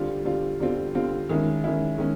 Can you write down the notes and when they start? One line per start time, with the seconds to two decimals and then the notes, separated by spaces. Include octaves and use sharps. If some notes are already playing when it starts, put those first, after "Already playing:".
Already playing: D3 G3 C4 F4
0.25 D3 G3 C4 F4
0.60 D3 G3 C4 F4
0.95 D3 G3 C4 F4
1.29 D#3 G#3 C#4 E4
1.64 D#3 G#3 C#4 E4
1.98 D#3 G#3 C#4